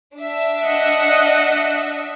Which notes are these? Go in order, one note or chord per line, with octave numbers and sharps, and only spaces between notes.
D4 E5
D#5 F#5